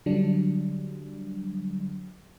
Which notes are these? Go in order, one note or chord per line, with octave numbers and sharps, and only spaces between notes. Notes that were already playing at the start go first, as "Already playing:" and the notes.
D3 F#3 G3 D4